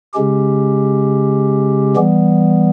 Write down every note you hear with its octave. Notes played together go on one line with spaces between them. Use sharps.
C#3 G#3 C#4 G4
E3 G3 B3